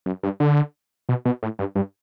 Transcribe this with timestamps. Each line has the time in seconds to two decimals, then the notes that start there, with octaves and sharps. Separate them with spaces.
0.06 F#2
0.23 G2
0.40 D3
1.09 B2
1.25 B2
1.43 A2
1.59 G2
1.75 G2